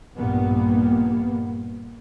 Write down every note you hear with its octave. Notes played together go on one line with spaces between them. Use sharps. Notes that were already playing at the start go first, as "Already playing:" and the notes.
A#1 G2 A#2 A#3 B3